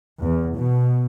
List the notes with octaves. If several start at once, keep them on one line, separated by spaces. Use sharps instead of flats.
E2
B2